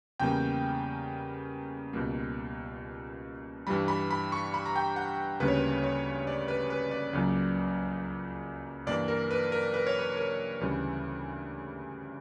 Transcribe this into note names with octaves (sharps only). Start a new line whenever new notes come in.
E2 C#3 G3 A#3 G5
C#2 B2 G3 A#3
G2 E3 G3 B5
B5
B5
C#6
B5
A#5
G5
F#5
D2 C#3 G3 A#3 B4
C#5
B4
C#5
D5
B4
B4
D5
C#2 C#3 F#3 A#3
G2 E3 A#3 D5
A#4
B4
A#4
B4
C#5
B4
A#4
D2 C#3 E3 G3